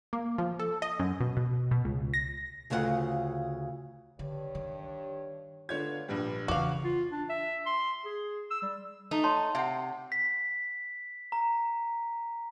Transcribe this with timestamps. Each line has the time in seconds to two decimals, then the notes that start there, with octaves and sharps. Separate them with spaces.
0.13 A#3
0.38 F3
0.59 A4
0.82 D#5
0.99 F#2
1.20 B2
1.37 B2
1.71 B2
1.85 C#2
2.14 A#6
2.70 D2 C#3 F4 B4 F#5
4.19 G2 D3 C#5
4.55 D#3
5.69 D3 B3 D4 F4 C#5 G#6
6.08 A#1 G2 G3 B4
6.48 E2 C#3 F#4 F5 D6
6.84 F4
7.12 D4
7.30 E5
7.66 C6
8.05 G#4
8.51 E6
8.62 G3
9.11 A3 D#4
9.24 C#5 A5 C6
9.55 C3 E5 F#5
10.12 B6
11.32 A#5